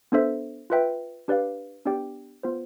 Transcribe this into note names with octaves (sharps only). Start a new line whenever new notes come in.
B3 D4 A4 C5 E5
F4 B4 E5 G5
D4 G4 B4 D5 F5
B3 D4 G4 D5 G5
B3 F4 C5